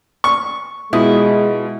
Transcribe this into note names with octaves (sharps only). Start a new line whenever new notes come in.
C#6
B2 G#3 E4 F4 D#6